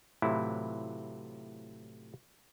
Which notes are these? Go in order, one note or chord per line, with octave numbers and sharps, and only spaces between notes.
A2 C3 E3 F#3 E4 F4